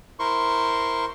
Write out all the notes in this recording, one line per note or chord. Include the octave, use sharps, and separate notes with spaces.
E4 A#4 C5 C6 C#6